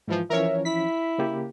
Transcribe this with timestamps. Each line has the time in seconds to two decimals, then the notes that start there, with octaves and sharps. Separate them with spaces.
0.07 G#2 E3 F3
0.30 E3 F3 C#4 A#4 C#5 E5
0.65 E4 B6
1.18 C#3 A#3 G4